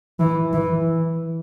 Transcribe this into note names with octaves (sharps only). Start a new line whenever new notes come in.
E3
E3